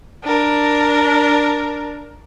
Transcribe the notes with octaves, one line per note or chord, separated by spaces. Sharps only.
D4 A#4